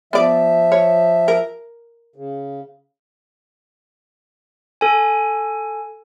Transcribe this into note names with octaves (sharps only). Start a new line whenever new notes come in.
F3 B3 D5 E5
C#5
A#4
C#3
A4 G#5